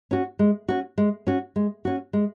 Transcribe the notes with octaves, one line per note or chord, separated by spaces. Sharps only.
C#4 F#4
G#3
C#4 F#4
G#3
C#4 F#4
G#3
C#4 F#4
G#3